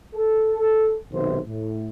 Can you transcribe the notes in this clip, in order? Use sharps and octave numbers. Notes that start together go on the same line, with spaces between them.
A4
B1 C3 D#3 C5
A2